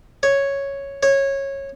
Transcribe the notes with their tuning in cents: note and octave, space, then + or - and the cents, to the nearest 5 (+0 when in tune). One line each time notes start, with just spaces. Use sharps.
C#5 +0
C#5 -15